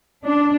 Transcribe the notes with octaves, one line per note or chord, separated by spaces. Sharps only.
D4